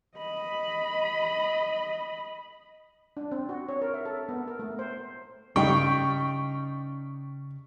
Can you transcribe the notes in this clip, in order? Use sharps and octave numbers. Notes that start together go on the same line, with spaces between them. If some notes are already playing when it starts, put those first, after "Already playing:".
D#5 B5
D4
C4
F#4
C#5
A#4
E5
A4
B3
A#4
A3
C5
G2 C#3 G3 D#4 G5 C#6